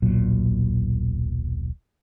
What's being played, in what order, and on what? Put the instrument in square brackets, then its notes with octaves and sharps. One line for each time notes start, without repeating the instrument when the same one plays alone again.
[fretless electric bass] D#1 B1 A#2 F#3